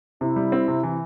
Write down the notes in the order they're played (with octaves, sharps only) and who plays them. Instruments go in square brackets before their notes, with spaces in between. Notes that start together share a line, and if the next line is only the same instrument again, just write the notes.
[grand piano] C3 [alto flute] E4
[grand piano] G3
C4
C3
E3